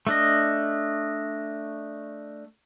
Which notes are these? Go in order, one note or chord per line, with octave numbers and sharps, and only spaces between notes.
A3 D4 D#5